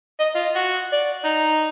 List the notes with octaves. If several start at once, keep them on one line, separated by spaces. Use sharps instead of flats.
D#5
F4
F#4
D5
D#4